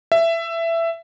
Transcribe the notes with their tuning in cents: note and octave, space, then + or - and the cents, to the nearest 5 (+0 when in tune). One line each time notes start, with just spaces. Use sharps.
E5 +15